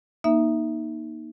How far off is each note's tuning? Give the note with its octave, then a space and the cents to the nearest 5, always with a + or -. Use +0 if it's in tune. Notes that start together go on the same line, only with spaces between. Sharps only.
A#3 +25 D#4 +0 E5 +0